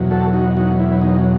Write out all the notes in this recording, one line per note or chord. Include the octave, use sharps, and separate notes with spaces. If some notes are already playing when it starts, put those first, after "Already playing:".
Already playing: E2 B2 F#3
F#4 A4
D#4 F#4
D#4 F#4
E4
D#4